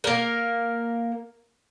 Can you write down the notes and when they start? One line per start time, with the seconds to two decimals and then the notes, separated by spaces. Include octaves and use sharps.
0.04 A#3 A#4